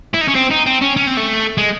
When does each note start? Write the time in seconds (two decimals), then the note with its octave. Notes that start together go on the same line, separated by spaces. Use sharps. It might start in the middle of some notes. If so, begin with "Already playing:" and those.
0.14 E4
0.21 D#4
0.28 C#4
0.35 C4
0.51 D#4
0.66 C4
0.81 C#4
0.97 C#4
1.07 C4
1.17 A3
1.58 G#3